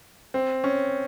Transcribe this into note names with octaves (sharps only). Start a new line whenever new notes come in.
C4
C#4